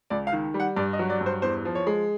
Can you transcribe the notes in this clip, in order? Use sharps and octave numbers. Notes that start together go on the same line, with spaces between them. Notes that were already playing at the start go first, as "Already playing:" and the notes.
C#2 D5
F5
D#3
G3
F#5
G2 D5
D#5
F#3
D5
G2
C5
E2 C5
F3
C#5
G#3